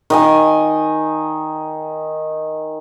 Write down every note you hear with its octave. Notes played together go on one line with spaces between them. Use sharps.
D#3 D#5 G#5